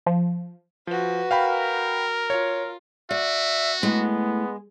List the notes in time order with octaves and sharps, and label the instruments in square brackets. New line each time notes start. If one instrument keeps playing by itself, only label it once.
[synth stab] F3
[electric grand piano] F3 [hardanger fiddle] F#4 B4
[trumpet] A#4 [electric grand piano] F5 G5 B5
[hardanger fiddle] F4 [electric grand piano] C#5
[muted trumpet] F#4 [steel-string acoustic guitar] D5 [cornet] E5
[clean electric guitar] A2 [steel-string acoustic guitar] G#3 [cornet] B3